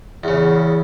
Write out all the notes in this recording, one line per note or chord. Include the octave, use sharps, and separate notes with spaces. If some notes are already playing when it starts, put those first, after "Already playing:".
E2 C#3